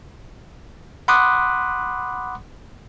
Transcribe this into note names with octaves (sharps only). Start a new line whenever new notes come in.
F#5 B5 C6 D6 D#6 F#6